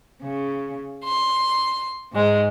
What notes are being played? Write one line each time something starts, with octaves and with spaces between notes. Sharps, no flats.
C#3
C6
G#2 G#3